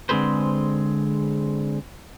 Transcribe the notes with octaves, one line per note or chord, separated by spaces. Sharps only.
D3 G#3 C4 G#4 B4 C5